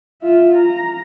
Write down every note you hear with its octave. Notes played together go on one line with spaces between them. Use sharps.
F4 E5
A#5